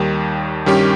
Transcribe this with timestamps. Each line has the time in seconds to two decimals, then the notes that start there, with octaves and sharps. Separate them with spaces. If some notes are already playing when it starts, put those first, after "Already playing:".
Already playing: D#2 D#3 G3
0.66 G2 D#3 G3 C#4 G4